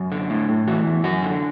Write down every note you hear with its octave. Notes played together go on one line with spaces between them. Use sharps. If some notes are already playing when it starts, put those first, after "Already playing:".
Already playing: F#2
D3
A2
A2
E3 F#4
E2
F#2 F#4
D3